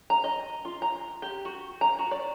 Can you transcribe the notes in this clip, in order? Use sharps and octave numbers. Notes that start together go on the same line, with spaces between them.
A#5
D#5
F4
A#5
G4
F#4
A#5
F#4
D5